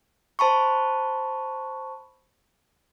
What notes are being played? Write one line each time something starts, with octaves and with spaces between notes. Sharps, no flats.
C5 A5 B5 C#6